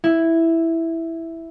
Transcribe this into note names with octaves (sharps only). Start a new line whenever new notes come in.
E4